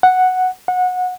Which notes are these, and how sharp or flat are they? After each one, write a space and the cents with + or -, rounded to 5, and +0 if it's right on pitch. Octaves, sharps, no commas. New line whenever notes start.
F#5 +0
F#5 -20